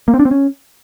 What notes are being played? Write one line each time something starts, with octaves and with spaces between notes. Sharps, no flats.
A#3
C4
D4
C4
C#4